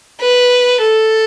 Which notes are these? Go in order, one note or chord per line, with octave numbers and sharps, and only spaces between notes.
B4
A4